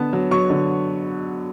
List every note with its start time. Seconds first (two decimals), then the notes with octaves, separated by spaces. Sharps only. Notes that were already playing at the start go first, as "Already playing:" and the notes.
Already playing: D3 B3 A5
0.13 F#3
0.31 F#3 C#6
0.50 D3